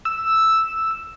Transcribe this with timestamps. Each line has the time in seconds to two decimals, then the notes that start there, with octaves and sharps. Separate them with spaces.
0.05 E6